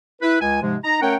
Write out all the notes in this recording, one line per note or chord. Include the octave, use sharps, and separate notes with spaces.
E4 B4
C#2 G#5
G#2 C3 F3 G#3
D#4 A#5
A3 C#4 A#4 C#5 F#5 G5